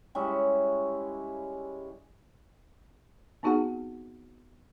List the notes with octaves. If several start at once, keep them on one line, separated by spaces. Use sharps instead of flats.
G3 G#3 C#4 E4
B3 C4 D#4 F#4 G#4 F#5